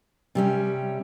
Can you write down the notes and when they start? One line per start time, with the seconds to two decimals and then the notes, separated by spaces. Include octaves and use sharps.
0.35 C3 G3 C#4